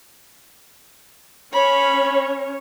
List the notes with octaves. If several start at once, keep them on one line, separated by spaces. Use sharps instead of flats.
C#4 C#5 B5